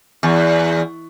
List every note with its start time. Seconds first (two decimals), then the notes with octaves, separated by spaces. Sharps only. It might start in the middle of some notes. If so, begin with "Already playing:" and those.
0.23 E2